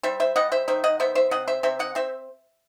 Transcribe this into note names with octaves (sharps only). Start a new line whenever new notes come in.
G3 C5 E5
C5 E5
G3 D#5 F#5
C5 E5
D#3 C5 E5
D#5 F#5
B3 C5 E5
C5 E5
C3 D#5 F#5
C5 E5
C3 C5 E5
D#5 F#5
C4 C5 E5